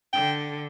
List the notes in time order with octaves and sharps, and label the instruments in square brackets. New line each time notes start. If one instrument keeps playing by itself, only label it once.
[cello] D3 [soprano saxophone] G5